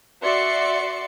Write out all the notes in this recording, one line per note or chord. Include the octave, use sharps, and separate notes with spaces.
F#4 D5 E5 C6 C#7